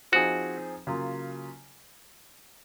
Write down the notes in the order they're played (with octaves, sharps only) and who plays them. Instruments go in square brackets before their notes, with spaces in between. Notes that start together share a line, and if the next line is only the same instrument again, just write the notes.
[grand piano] F3 C4 D#4 G#4 [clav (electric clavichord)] F#4
[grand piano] C#3 F#3 A#3 F4